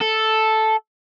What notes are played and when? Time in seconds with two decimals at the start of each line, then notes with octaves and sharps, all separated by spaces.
0.01 A4